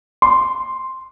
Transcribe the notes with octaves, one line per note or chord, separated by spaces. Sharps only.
C6